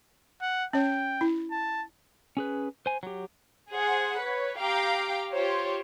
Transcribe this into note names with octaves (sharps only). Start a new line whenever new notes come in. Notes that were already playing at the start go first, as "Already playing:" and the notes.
F#5
C#4 C#5 G5
E4
A5
C#4 G#4 B4
C5 G#5
F#3 G4
G#4 C5 F#5
B4 C#5
G4 F5 G5 A#5 D6
F4 G4 C5 C#5